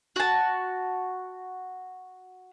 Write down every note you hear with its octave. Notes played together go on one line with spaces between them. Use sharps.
F#4 A5